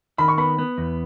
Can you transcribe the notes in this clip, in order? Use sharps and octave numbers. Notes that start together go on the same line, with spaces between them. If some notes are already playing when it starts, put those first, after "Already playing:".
D#3 B5
C#6
B3 B5
B3
E2